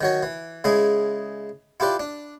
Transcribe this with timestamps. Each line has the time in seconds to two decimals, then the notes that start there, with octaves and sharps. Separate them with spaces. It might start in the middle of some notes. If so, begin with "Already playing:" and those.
0.01 D#3 F#3 C#5
0.23 E3
0.64 C#3 G#3 E4 G#4
1.80 E4 F4 G4 B4 D5
1.99 D4